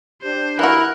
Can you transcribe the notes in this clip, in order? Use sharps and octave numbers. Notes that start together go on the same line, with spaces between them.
D4 G4 C5
E3 E4 F#4 A#4 F#6